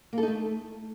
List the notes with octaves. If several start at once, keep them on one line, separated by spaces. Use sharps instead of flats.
A#3
A4
D#4
A3